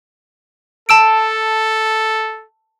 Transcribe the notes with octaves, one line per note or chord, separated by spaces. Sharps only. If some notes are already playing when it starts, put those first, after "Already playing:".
A4 A5 E6 D7